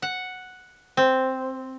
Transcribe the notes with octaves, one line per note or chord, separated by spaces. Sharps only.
F#5
C4